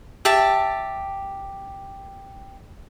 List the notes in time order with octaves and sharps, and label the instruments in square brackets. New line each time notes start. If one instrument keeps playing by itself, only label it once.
[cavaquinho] G4 E5 A5